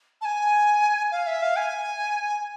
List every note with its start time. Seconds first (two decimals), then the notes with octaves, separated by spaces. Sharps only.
0.21 A5
0.25 G#5
1.11 F5
1.26 E5
1.42 F5
1.56 G#5